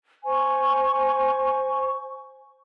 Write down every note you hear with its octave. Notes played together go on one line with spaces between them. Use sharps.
C5 G#5 C#6